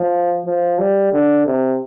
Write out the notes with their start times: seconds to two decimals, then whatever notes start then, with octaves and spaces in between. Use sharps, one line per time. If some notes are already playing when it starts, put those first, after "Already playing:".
Already playing: F3
0.46 F3
0.79 G3
1.12 D3
1.46 C3